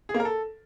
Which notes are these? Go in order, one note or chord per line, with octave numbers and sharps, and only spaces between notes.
G#4
A#3
A#4
A4